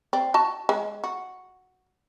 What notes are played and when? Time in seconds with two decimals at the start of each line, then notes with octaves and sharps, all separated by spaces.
0.13 C4 D5
0.34 F#4 A5
0.69 G#3
1.04 F#4